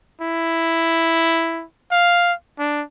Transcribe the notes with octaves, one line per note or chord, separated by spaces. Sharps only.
E4
F5
D4